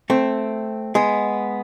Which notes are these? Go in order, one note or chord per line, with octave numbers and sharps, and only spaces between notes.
A3 C4
G#3 B3